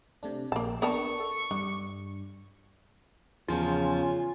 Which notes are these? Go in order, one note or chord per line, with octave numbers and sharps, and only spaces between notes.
C3 A3 D4
A#1 A#3 A5
B3 D4 A#4 A5 C#6
A4
G2 D4
E2 C#3 F3 F4 G#5